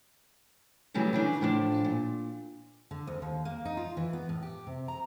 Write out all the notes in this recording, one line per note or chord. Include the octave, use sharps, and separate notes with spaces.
C#3 E3 F#3 G3 A3
C#3 E3 D4 G#5
A2 F3 D4
A#2
D3
D2
D#2
A#3
D#4
F4
E3
B3
A2
G4
C3
A#5